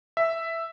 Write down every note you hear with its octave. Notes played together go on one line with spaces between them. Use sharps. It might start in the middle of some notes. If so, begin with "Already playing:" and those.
E5